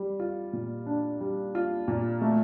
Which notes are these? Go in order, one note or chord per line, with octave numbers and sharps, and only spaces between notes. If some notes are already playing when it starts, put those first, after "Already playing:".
Already playing: G3
F4
A#2
D4
G3
F4
A#2
A3